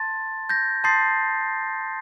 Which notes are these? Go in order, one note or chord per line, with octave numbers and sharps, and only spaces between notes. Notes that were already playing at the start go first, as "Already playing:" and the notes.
Already playing: A5 C6 A6
G6 A#6
A5 C6 D#6 G6 A6 C7